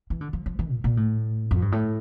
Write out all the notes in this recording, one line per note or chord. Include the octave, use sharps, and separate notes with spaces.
E3
D3
F3
F3
E3
A#2
A#2
A2
F2
G2
A2